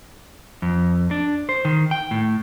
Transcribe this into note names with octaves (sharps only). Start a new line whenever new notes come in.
F2
D4
C5
D#3
G5
A2